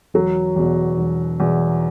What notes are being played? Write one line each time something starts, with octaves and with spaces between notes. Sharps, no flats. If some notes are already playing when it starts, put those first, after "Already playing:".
E1 F#3
E2 B2
E1
E2 B2